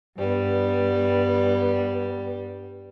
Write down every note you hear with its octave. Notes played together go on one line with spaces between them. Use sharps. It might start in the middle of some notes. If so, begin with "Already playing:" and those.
G2 G3 B3